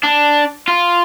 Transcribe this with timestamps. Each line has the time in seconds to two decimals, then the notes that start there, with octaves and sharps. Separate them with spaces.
0.03 D4
0.68 F4